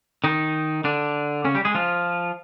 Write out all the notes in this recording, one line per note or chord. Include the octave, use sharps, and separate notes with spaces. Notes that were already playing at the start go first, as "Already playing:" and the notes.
D#3 D#4
D3 D4
C#3 C#4
G3 G4
G#3 G#4
F3 F4